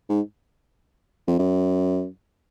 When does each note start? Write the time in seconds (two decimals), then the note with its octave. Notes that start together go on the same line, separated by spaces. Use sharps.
0.09 G#2
1.28 F2
1.39 F#2